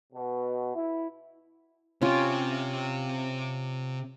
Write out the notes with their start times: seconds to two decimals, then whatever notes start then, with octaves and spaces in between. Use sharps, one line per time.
0.13 B2
0.75 E4
2.02 C3 C#4 F4 G4